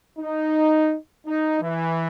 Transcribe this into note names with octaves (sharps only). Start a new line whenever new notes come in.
D#4
D#4
E3